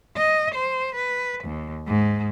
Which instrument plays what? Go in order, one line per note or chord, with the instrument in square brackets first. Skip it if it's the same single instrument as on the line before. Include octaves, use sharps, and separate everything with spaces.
[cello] D#5
C5
B4
D#2
G#2